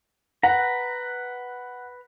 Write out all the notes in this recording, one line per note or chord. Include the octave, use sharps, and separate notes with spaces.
B4 F#5 A#5